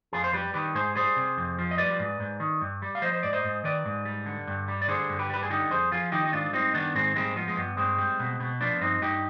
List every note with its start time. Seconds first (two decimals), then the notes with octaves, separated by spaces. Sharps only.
0.13 F2 F4 G#4
0.24 C5
0.33 G3 G4 B4
0.54 D#3 G4 B4
0.75 G#2 G#4 C5
0.95 G3 G#4 C5
1.17 C3
1.37 F2
1.59 F3
1.71 D#5
1.78 G3 B4 D5
1.99 G#2
2.20 G#2
2.40 D#3
2.61 G2
2.82 G3
2.95 F5
3.02 F3 C5 D#5
3.13 C5
3.23 G#2 D5
3.33 C5 D#5
3.44 G#2
3.64 D#3 B4 D5
3.86 G#2
4.05 G3
4.26 D3
4.47 G2
4.68 G3
4.82 D5
4.88 D3 G#4 C5
5.09 G2
5.19 G4 B4
5.30 G3 B4
5.43 G#4
5.50 D3 D#4 G4
5.71 F2 G#4 C5
5.92 F3 F4 G#4
6.12 D#3 D#4 G4
6.25 D#4
6.33 G#2 D4 F4
6.53 G3 C4 D#4
6.74 D#3 B3 D4
6.95 G#2 G#3 C4
7.16 G3 G#3 C4
7.36 F3 B3
7.48 G#3
7.57 G2 B3
7.77 G2 G#3 C4
7.98 G3
8.20 B2
8.40 B2
8.61 F3 B3 D4
8.81 G2 C4 D#4
9.02 G2 D#4 G4